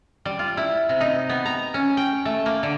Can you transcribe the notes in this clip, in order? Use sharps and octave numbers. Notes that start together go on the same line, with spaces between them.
G3
F4
E4
C3
D#4
B3
A#5
C#4
G5
A3
A#3
D3